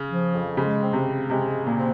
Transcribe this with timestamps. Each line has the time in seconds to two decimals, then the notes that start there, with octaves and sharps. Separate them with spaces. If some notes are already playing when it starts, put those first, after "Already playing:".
Already playing: C#3
0.09 F3
0.33 F2
0.57 C#3 G#3
0.81 C4
0.93 C3
1.06 C4
1.30 C3 G#3
1.54 C#3
1.66 A#2
1.77 C4